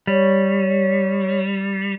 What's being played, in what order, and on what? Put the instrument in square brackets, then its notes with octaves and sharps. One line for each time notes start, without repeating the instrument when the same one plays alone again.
[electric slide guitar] G3 [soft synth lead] C#5